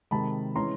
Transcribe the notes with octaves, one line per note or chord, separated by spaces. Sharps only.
C3 D#3 G#3 A5 B5
E3 G#3 C#4 A#5 C6